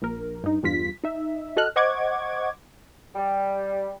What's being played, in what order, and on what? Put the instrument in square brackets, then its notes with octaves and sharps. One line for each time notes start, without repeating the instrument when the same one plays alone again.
[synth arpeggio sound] A#1 A#4
G2 D#4
E2 G2 F4 B6
D#4 E5
F#4 A4 D#5 F6 F#6
C5 D#5 F#5 C#6 D6 G#6
[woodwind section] G3